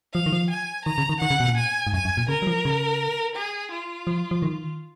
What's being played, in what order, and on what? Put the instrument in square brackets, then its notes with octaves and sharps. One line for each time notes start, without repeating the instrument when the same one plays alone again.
[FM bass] F3 [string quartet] F5
[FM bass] D#3
F3
[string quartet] G#5
[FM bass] D#3 [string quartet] A#5
[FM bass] C#3
D#3
[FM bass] D#3 [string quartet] F#5
[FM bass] C#3
B2
A#2
[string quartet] G#5
[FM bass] G#2
[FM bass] F#2 [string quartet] G#5
[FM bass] F#2
A#2
[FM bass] C#3 [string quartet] A#4
[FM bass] F#3
F3
C#3
[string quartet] G#4
F4
[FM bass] F3
F3
D#3